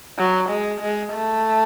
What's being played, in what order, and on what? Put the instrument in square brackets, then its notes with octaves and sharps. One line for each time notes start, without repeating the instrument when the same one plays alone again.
[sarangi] F#3
G#3
G#3
A3